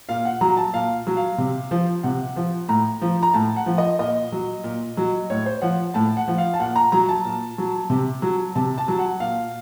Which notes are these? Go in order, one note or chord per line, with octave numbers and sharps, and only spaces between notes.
A#2 F5
F#5
F#3 A#5
A5
A#2 F5
F#3
F5
C3
F3
C3 F#5
F3
A2 A#5
F3
A#5
A2 A5
F#5
F3
D#5
A#2 D#5
F#3
A#2
F#3
A2 C#5
C5
F3 F#5
A2 A5
F#5
F3
F5
A5
A#2 F#5
A#5
F#3 A#5
A5
A#2
F#3
C3
F#3
C3 A5
A5
F#3
F#5
A#2 F5